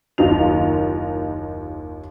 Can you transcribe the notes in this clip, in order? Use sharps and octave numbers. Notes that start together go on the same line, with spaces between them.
F#1 D#2 D#4 F4 F7